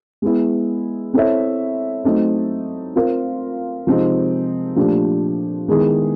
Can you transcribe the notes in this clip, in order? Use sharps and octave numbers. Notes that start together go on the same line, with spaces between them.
G#3 B3 E4
C4 E4 A4 C#5 E5
F#3 A3 C4 D#4
C4 F4 A#4
C3 F3 G#3 C4 D#4
A#2 F3 A3 D4 G4
D#3 G#3 B3 E4 G#4